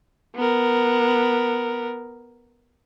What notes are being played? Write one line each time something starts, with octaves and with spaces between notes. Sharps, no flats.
B3 A#4